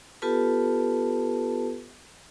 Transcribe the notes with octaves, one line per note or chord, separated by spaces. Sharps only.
B3 F4 G4 A4 B4 A5